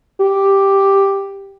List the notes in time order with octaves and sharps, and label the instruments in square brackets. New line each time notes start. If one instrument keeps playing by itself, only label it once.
[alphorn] G4